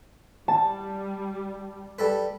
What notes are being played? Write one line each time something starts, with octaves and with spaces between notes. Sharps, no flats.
G3 A5
G3 A4 B4